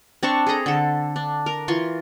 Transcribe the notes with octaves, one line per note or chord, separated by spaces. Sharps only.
C4 D4 A5 C#6
G#4 A4 D#5 A#5
D3 A4
D4
A#4
E3 F4 C6 C#6